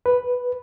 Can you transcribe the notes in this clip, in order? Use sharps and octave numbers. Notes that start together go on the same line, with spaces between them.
B4